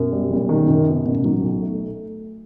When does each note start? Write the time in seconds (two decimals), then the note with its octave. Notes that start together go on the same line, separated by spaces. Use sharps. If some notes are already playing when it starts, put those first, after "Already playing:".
Already playing: F#2 B2
0.12 G3
0.31 F#1
0.49 D#3
0.68 F#2 C3
0.87 C3 B3
1.06 A1 B2
1.15 C3
1.24 B2 D#3 F#3
1.43 B1
1.62 A3